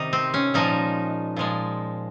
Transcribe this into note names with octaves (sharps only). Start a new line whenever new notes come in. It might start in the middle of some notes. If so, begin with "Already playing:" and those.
Already playing: C3 D#3 G3 D#4
C4
C#4
A#2 F3 G#3 D#4
A#2 F3 G#3